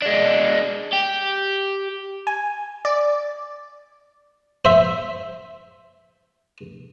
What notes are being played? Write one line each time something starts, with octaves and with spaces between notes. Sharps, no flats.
G#3 D4
G4
G#5
D5
C5 E5